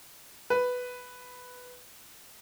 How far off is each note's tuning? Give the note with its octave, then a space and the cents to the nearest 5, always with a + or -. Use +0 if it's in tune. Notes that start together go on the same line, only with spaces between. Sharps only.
B4 +5